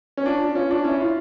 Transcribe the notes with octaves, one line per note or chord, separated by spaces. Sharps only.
C#4
D4 F4
C#4 F4
D4
C#4 E4
F4